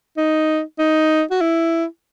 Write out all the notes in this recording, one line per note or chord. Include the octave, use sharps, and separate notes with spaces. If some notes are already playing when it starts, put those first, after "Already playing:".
D#4
D#4
F#4
E4